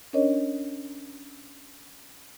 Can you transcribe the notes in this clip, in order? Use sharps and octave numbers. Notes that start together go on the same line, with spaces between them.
C#4 D4 A#4 C#5 D#5